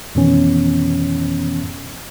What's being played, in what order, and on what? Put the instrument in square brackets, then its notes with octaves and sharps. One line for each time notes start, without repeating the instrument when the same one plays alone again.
[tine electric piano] F2 B2 D#3 E3 B3 C#4